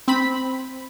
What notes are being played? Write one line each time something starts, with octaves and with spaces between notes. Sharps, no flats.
C4 B5